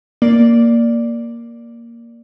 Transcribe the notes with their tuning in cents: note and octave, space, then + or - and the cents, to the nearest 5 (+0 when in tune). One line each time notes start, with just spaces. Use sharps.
A#3 +0 D5 +0